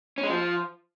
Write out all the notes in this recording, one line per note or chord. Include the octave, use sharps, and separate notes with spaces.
C#4
G#3
F3